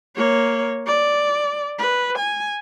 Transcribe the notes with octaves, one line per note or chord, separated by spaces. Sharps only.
A#3 C#5
D5
B4
G#5